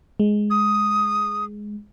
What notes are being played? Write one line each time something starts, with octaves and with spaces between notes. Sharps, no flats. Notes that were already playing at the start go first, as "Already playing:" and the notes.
G#3
D#6